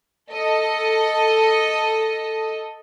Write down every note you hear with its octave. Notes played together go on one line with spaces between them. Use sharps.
A4 D#5